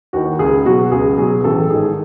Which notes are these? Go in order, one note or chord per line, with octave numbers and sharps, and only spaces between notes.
D#2 D#3 F#4
C#2 G#4
B2 F#3 F#4
C#2 G#4
B2 F#3 G#4
A1 A4
G#2 D#3 G#4